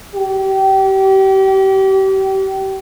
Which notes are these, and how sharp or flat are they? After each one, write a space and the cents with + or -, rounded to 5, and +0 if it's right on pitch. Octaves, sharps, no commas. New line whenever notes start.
G4 -30